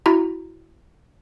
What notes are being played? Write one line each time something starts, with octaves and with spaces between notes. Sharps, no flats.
E4 F#4 A#5